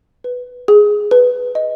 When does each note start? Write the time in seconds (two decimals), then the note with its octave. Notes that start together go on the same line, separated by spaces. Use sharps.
0.24 B4
0.68 G#4
1.11 B4
1.55 D#5